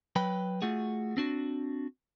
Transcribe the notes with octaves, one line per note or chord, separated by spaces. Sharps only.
F#3 B4 G5 B5
A3 F4 F#4 G#4
C4 D4 F#4